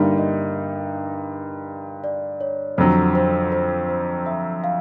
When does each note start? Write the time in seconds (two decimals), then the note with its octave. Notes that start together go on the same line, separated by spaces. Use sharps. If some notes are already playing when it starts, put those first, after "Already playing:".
Already playing: G2 D3 G3 A#3 D#4 E5
0.18 D#5
2.04 D5
2.41 C#5
2.78 F2 D3 F#3 C5
3.15 C5
3.52 C5
3.89 C5
4.26 E5
4.64 F5